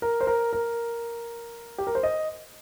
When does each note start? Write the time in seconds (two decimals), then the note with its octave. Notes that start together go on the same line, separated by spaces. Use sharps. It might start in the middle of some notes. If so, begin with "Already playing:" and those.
0.02 A#4
0.21 C5
0.27 A#4
0.53 A#4
1.78 G4
1.87 A#4
1.95 C5
2.03 D#5